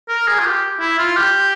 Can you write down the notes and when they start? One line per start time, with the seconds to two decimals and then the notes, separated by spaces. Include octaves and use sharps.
0.09 A#4
0.28 G#4
0.39 F4
0.45 G4
0.80 E4
0.98 F4
1.16 G4